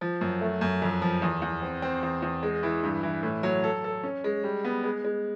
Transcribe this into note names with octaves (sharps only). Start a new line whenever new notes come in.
F3
F#2
A3
F#2
F2
F3
E2
E2
C4
C4
E2
E2
G#3
E3
G2
E3
A2
F#3
A4
A4
C#4
G#3
G3
B3
G#3
G#3